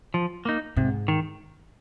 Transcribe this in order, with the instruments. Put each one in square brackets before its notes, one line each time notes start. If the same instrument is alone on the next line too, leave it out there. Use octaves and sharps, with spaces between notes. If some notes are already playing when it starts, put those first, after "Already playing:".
[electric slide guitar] F3
A#3 D#4
[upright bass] G#2 [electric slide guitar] C3
[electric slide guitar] D#3